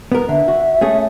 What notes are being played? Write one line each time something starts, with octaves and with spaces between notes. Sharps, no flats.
B3 A#4
D3 E5
F#4
A3 C#4 G#4